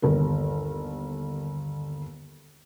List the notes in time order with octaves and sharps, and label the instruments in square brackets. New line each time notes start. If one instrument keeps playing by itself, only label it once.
[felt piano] G1 D#2 A#4